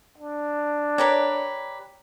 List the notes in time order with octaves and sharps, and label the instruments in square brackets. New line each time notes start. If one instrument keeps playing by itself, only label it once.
[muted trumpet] D4
[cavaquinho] G4 A#4 B4 [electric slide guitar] C#5 D5